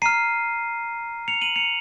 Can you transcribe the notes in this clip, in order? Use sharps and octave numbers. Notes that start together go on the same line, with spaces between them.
A#5 F6 C7 D#7
C#7 F7
D#7 F#7
C#7 F7